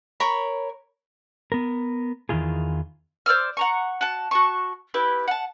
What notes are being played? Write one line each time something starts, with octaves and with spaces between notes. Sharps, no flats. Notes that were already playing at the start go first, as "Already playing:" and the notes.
A#4 C#5 B5
B3 A#4
E2 D#3 E3 F4 G#4
C5 D5 E6 F6
F#5 A#5 C#6
F#4 A5
F#4 A5 C#6
E4 G4 B4
F#5 A5